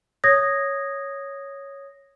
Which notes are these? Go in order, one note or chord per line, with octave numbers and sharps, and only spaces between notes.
C#5 D#6 G#6 A#6